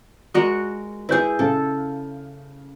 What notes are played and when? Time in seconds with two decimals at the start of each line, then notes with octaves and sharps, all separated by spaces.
0.34 G#3 F#4 A#4
1.09 E4 G#4 B4 G6
1.39 C#3 A4 F5